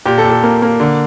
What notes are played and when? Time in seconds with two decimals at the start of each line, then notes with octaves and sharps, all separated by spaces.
0.05 A#2 G4
0.18 A4
0.24 A#2
0.30 A4
0.43 A#3
0.62 A#3
0.80 D3